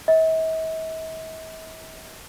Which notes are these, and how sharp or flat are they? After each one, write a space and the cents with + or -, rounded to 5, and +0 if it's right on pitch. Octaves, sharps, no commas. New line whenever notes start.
E5 -45